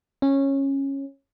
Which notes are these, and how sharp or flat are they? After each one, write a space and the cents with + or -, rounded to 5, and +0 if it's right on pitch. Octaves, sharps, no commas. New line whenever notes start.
C#4 -15